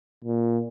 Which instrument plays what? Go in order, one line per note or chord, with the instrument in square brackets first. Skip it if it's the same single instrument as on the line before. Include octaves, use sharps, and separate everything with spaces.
[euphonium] A#2